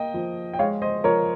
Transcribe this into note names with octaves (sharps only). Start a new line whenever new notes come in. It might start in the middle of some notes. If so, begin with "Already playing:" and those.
Already playing: A#3 D#5 G5
F3
G5
G#3 C#5 F5
C5 D#5
F3 A#4 C#5